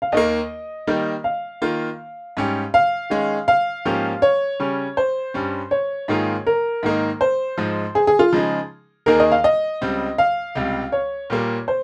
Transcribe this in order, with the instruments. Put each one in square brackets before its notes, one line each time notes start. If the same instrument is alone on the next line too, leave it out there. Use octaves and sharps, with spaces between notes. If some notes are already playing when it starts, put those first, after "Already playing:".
[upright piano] F5
[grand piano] D#2 D#3 A#3 [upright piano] D#5
[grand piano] D#3 G3 A#3 D#4
[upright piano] F5
[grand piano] D#3 A#3 F4
G#2 G3 C#4 G4
[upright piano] F5
[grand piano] D#3 G#3 C#4 G#4
[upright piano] F5
[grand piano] G#2 F3 A#3 C#4 G4
[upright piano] C#5
[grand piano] C#3 G3 C#4
[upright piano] C5
[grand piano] G2 G3 C#4
[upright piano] C#5
[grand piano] G#2 D#3 A#3 F4 G#4
[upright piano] A#4
[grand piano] G#2 D#3 A#3 D#4
[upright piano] C5
[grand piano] G#2 F3 G#3
[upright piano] G#4
G#4
F4
[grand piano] C#3 F3 G#3 D#4 G#4
[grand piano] D#2 D#3 A#3 D#4 G#4 [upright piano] A#4
[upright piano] D#5
F5
D#5
[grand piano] C#2 C#3 G3 C4
[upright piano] F5
[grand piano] C#2 C3 G3
[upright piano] C#5
[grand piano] A#2 G3 A#3
[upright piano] C5